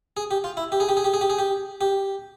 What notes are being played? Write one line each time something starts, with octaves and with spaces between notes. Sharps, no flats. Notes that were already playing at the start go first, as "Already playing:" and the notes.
G#4
G4
F4
E4
G4
G#4
G4
G#4
G4
G#4
G4
G#4
G4
G4